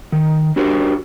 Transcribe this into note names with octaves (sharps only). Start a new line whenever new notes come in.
D#3
D4 F#4 G4 A#4 C5